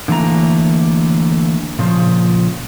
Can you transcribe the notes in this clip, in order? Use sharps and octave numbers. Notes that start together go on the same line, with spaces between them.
D3 E3 A3 A#3 A#5
A#2 C#3 F3